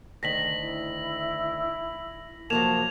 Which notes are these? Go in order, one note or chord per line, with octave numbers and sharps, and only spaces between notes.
D2 D#3 A#6 B6 F#7
E4
F3 F#3 A#3 A5 G#6 E7 F7